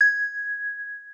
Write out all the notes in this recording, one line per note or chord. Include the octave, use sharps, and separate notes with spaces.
G#6